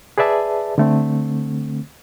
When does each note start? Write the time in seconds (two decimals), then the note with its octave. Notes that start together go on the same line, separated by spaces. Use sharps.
0.18 G#4 B4 D5 E5 A5
0.78 D3 A3 C4